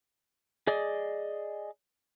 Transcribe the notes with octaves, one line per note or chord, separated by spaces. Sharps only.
G#4 D5 D#5